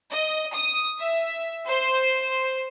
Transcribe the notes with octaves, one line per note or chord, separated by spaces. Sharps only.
D#5
D#6
E5
C5